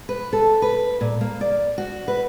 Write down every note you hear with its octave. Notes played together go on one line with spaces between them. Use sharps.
B4
A4
B4
A#2
A#3
D5
F#4
B4